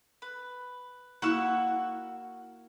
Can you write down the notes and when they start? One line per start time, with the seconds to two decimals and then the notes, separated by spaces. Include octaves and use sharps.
0.22 B4
1.22 A#3 E4 F#4 F#5 C#6 E6